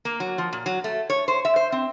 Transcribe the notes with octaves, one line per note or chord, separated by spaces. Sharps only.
A#3
F#3
F3
A#2
F#3
A3
C#5
C5
E5
C5
C4